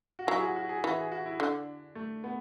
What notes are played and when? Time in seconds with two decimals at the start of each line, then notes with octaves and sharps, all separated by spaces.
0.19 F#4
0.27 F#3 E4
0.38 G#4
0.42 F#4
0.56 F#4
0.69 G#4
0.83 E3 F#4
0.98 G#4
1.12 F#4
1.26 E4
1.40 D3 D4
1.95 A3
2.24 B3